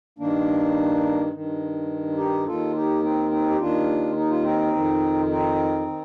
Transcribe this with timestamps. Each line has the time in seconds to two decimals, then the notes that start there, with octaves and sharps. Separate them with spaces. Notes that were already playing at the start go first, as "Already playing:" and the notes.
0.19 G2 D#3 A#3 D4
1.33 G2 D#3
2.17 D#4 G4
2.46 D#2 D#3 F4 A4
2.75 D#4 G4
3.03 C4 D#4
3.31 C4 D#4
3.50 G4
3.60 D#2 D#3 D4 F4
4.17 D#4
4.30 F4
4.43 C4 D#4
4.73 F2 D#3
5.31 C4 D#4
5.88 D#3